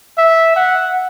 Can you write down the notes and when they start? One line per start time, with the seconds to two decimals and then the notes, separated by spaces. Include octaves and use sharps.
0.18 E5
0.56 F#5